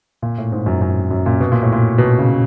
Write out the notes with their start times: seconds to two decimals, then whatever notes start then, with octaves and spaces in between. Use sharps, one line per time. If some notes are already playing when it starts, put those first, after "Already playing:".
0.22 A#2
0.38 A2
0.52 G#2
0.66 F#2
0.82 F#2
1.11 F#2
1.26 A#2
1.41 B2
1.52 A#2
1.63 A2
1.72 A#2
1.98 B2
2.18 C#3